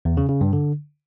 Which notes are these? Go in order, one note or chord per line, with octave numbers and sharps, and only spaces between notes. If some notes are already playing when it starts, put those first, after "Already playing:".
E2
C#3
C#3
G2
D3